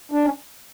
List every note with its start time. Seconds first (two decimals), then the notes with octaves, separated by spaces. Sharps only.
0.12 D4
0.25 C#4